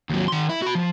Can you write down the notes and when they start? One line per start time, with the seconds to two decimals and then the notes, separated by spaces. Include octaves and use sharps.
0.10 D#2 F#3
0.28 D#3 C6
0.49 E4
0.62 F#4 B5
0.75 F3